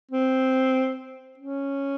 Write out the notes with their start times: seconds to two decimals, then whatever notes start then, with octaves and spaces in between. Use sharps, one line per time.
0.11 C4
1.38 C#4